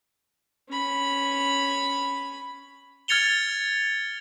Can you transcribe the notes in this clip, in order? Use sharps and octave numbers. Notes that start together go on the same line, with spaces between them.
C#4 B5
F6 G#6 A6 C#7 F7 G7